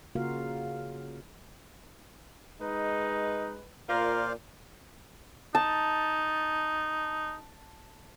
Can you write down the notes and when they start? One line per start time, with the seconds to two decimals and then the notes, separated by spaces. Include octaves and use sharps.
0.15 C#3 A#3 F4 F#4 A#4 F5
2.61 G#3 D#4 B4
3.89 A#2 F4 A#4 C5 D5 F5
5.55 D#4 A5